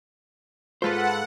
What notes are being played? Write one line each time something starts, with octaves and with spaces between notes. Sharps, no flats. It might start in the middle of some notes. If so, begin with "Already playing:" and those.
G#2 G#3 F4 A4 B4 C5 F#5